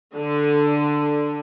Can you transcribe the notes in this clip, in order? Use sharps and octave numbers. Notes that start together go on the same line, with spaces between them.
D3